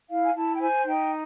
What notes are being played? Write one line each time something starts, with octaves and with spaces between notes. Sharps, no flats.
E4 F5
G#5
E4 A5
G5
C5 G#5
D#4 G5